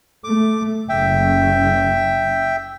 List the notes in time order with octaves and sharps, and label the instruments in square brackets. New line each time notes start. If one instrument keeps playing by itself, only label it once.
[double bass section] A3 [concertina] D6
[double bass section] F#1 C#4 [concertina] E5 G5